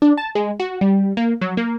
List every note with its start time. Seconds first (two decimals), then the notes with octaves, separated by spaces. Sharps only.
0.02 D4
0.17 A5
0.35 G#3
0.60 F#4
0.81 G3
1.17 A#3
1.41 F#3
1.57 A#3